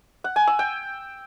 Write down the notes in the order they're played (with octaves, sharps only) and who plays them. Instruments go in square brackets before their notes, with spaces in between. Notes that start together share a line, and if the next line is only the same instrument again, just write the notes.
[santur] F#5
G#5
E6
G5